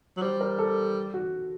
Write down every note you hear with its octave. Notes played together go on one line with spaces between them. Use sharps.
F#3
G3 C5
A#4
A4
F#4